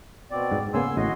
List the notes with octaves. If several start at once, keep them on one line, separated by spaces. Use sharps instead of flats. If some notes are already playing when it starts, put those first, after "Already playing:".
B2 C4 D5
G#2
C#3 A#3 B3 G#5 C6 E6
A1 A2 F#4 D#5 C6